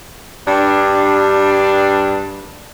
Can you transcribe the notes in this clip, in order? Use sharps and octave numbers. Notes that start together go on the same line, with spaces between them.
G2 D4